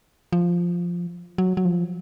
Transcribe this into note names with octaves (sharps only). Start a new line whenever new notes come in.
F3
F#3
F#3
F3